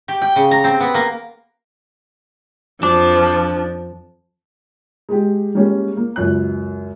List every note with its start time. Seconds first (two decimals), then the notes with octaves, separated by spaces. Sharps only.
0.08 G4
0.22 G5
0.36 C#3
0.51 A#5
0.64 C4
0.80 B3
0.94 A#3
2.83 F2 F3 D4
5.09 G#3 G4
5.55 G3 G#3 A#3 C#4
5.97 A#3
6.16 C#2 F#2 F#6